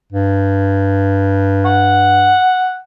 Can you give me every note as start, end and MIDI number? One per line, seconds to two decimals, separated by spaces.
0.12 2.37 43
1.66 2.77 78